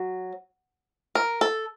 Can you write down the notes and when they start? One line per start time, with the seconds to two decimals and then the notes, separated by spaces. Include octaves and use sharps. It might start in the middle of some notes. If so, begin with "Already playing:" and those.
Already playing: F#3
1.15 A#4
1.41 A4